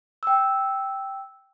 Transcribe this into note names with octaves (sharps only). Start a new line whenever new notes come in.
G5 E6